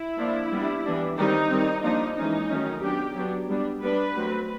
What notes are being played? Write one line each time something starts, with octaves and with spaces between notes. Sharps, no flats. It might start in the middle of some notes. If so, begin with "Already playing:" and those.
Already playing: E4
F3 A#3 D4
G3 B3 D4
E3 G3 B3 D4
D#3 G3 C4 D#4
D#3 G3 C4
F3 A#3 D4 D#4
E3 G#3 C#4 D#4
D#3 F#3 A3 C#4
F#3 B3 D4 G4
F#3 B3 D4
G3 B3 D4
G3 B3 D4 B4
F#3 A3 C4